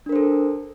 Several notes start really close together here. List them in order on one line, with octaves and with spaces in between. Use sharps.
D4 A#4 C5 A4